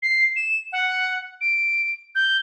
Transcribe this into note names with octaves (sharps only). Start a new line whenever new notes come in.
C7
E7
F#5
D7
G6